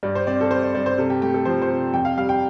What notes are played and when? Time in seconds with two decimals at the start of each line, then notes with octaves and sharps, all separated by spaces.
0.03 G2 D5
0.15 C5
0.27 C4 D5
0.41 A4
0.51 G3 C5
0.63 D5
0.75 G2 D5
0.86 C5
0.98 C3 A4
1.10 G4
1.22 A3 G4
1.34 A4
1.45 F3 C5
1.62 C5
1.70 C3
1.93 F2 G5
2.05 F5
2.17 G3 F5
2.29 G5